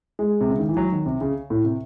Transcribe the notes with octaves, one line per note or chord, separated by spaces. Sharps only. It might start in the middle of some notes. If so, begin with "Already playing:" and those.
G#3
C3
C#3
D#3
E3
F#3
D#3
C3
C#3
A2
C3